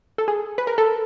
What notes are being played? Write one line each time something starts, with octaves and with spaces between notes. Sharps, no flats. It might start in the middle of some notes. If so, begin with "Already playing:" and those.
A4
G#4
B4
A#4
A4